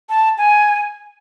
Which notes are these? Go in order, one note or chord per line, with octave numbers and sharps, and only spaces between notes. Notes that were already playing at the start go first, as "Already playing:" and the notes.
A5
G#5